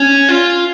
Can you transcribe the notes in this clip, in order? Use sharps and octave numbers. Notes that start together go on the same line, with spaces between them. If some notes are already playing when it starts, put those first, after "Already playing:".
Already playing: C#4
F4